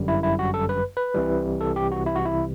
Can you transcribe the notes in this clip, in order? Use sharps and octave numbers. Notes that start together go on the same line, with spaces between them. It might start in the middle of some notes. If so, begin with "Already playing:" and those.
Already playing: G1 F#2 D3 G3
E4
E4
F#4
A4
B4
B4
C2 C3 E3 G3
A4
G4
F#4
E4
F#4
E4